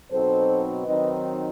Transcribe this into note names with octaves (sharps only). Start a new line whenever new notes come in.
B2 F#3 C4 D#4 A4 C5
D#3 F#3 C4 D#4 B4 D#5